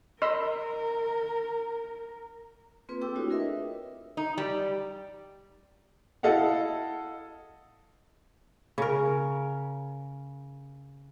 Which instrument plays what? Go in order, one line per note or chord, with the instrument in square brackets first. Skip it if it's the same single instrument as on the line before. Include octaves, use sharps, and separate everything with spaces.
[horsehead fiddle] A#4 [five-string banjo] D#5 [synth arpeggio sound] B5 C6 E6
[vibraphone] A#3 C4 F4 G#4 B4
C4 G4 A4 G5 D6 E6
A3 D4 E4 F#4 C#5 D#6
D4 F4 G#4 A#4 D#5 E5
B4
[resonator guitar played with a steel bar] D#4
G3
[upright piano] E4 A4 D#5 F5 F#5
[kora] C#3 A#4